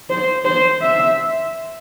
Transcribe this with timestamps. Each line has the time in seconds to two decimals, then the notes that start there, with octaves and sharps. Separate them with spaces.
0.10 C5
0.45 C5
0.82 E5